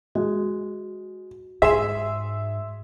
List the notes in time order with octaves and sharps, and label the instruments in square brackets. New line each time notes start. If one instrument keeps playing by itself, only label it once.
[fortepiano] G#3 [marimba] F#4
[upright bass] G#2 [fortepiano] G#4 [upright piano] E5 C6 E7